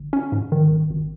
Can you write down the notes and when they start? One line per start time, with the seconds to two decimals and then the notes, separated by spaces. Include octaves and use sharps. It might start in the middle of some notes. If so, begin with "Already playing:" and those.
Already playing: G1
0.13 C#4
0.32 G#2
0.52 D#3
0.71 G#1
0.90 G#1